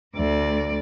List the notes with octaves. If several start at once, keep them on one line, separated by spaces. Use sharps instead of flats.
D2 D5